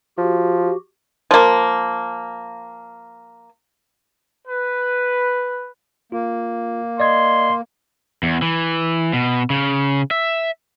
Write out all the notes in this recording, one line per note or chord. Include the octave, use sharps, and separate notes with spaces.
F3 F#4 G4
F3 A#3
B4
A#3 F4
D5 D#5 C6 G#6
E2
E3
B2
C#3
E5